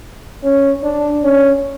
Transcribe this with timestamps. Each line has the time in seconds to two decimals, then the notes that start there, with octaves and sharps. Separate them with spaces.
0.43 C#4
0.83 D4
1.23 C#4